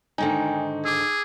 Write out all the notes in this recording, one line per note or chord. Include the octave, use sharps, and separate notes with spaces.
G#2 D3 D#3 D#4 G5 G#5
G#4 D6 E6